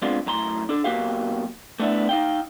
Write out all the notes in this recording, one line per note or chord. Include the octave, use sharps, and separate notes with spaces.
G#3 B3 C4 D4 F4
F#2 A2 A#5 C6
D4 A4
B1 A#3 F#4 G4 F5
A3 B3 D4 E4
D#4 F5 G5